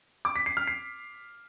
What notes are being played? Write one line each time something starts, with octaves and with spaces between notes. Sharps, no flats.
D6
B6
C7
F6
C7